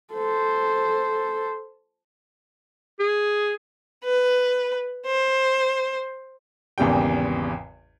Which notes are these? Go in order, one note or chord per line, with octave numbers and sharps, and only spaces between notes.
A4 C5
G#4
B4
C5
G#1 E2 C#3 G3 G5